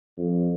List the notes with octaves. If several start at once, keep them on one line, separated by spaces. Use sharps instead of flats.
F2